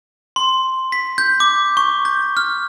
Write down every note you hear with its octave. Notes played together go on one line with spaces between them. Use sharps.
C6
B6
G6
D6
C#6
G6
F6